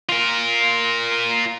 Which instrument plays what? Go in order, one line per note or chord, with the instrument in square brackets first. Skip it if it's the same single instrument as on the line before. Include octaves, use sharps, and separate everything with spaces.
[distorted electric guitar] F4 A#4